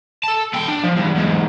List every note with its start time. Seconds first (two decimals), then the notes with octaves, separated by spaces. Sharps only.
0.24 A4 A5
0.53 B3 G5
0.68 D4
0.83 F3
0.96 E2 G2
1.15 E2 G#2